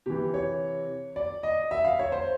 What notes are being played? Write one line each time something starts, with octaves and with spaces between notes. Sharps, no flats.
C3 E3 G4
C#5
D5
D#5
E5
F5
C#5
C5